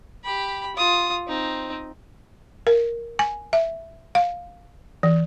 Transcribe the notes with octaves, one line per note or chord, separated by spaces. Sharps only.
G4 B5
F4 D#6
C4 D#4
A#4
G#5
E5
F5
E3